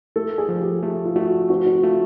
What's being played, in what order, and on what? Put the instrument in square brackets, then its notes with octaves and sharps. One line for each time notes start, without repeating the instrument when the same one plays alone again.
[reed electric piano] A3 [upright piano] A4
[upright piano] G#4
[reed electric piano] F3
[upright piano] G4
[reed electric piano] A3 [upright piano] G4
[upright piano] F4
[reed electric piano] A3 [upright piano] F#4
[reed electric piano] C4 [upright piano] F#4
[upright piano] F#4
[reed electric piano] A3 [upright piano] F4